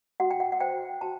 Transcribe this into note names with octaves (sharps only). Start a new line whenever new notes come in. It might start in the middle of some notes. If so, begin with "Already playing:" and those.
F#4 F#5
G5
F#5
F#5
C5 G5
F#4 A5